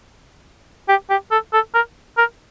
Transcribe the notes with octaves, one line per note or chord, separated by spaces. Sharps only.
G4
G4
A4
A4
A#4
A#4